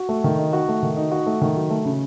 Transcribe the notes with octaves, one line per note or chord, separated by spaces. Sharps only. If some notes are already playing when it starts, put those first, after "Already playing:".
Already playing: F#4
A3
D#3
D#4
F#4
A3
D#3
D#4
F#4
A3
D#3
F#3
A3
C#3